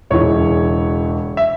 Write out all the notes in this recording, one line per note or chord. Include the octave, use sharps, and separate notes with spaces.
E1 E2 C#3 E3 C#5
E5